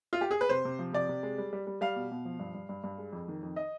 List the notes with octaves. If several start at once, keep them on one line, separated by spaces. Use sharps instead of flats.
F4
G4
G#4
B4
C3 C5
C3
F3
C3 D5
C3
G#3
G3
G3
G3
G3 F5
B2
B2
F3
G2
G2
G2
G2
G#3
F2
D#3
F2
D#5